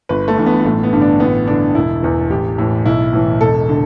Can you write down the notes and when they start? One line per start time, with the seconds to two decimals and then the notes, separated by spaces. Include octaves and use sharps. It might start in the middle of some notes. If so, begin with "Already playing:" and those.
0.09 G1 B4
0.28 A3
0.37 G2 E3
0.46 B3
0.65 A1 A3
0.83 B3
0.93 G2 D3
1.01 D4
1.20 A1 B3
1.47 G2 D3 D4
1.75 E1 E4
2.03 E2 E3
2.30 A1 G4
2.58 A2 E3
2.85 B1 E4
3.13 A2 E3
3.41 E1 A4
3.69 D3